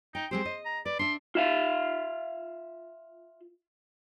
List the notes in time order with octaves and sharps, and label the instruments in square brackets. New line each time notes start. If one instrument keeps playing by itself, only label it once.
[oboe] D#4 [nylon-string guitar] G5
[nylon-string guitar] G#3 C4 G4 [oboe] C5
[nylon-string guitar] D#5
[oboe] A#5
[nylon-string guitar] B4 [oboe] D5
[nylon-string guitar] D4 E5 [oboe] C6
[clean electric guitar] F4 E5 F5